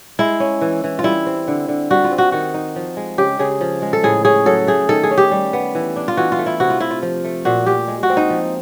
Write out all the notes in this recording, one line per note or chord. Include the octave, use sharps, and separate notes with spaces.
G#3 E4
C#4
E3
E3
F4
G3 E4
C4
D3
D3
G3 F#4
F4
C4
F#4
D#3 F#4
D#4
F3
G#3
C#3 G4
C#3 G#4
F3
G#3
A4
A2 G#4
C#4 G#4
F#3 A4
A3 G#4
D#3 A4
G#4
C#4
G4
G3
B3
E3
D4
F4
E3 F#4
F4
A3
E4
C3 F#4
F4
C3 E4
F4
F3
A3
A#2 F#4
A#2 G4
G#3
F#4
C4
D#4
F3